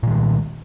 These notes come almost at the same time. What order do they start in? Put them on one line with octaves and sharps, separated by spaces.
A#2 D#3 G#3